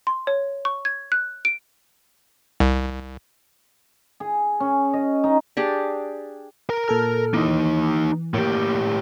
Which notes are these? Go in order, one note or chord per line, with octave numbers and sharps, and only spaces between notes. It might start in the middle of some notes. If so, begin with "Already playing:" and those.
C6
C#5
C#6
G#6
F#6
D7
C2
G#4
C#4
D#5
D#4
D4 G4 G#4
A#4 A#5
A#2 A4 F6
E3 A#3 D#4
A2 A#3 G4